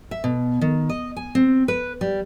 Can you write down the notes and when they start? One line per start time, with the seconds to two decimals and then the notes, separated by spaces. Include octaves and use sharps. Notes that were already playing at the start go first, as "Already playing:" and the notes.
0.11 E5
0.24 B2
0.61 D#3
0.89 D#5
1.16 G#5
1.35 C4
1.68 B4
2.01 G3